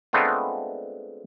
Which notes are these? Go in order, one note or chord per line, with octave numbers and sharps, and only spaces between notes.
G#3 A3 B3 C4 D4 F4